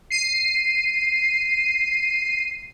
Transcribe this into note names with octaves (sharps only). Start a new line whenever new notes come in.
C7 D#7